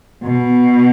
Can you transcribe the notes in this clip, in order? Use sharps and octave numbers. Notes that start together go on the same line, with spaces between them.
B2